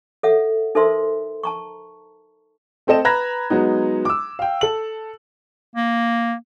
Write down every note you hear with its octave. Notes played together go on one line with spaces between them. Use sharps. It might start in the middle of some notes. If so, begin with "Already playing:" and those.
A4 C#5 E5 F#5
D#4 A4 A#4 C5 E5 C6
A5 A#5 C#6
A3 C4 A4 D#5 E7
B4 A#5 B5 F#6 G#6 A#6
F#3 G#3 B3 D#4
D6 E6
F5 G5
A4 F#7
A#3